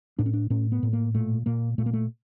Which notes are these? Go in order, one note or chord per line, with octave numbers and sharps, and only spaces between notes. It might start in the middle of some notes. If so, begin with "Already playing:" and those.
A2 D4
C#4
D4
A2 C#4
B3
A2
A#3
A#2 A3
A#2 A#3
A#2 A3
A#3
A3